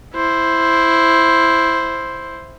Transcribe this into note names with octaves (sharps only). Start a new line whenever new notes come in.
E4 C5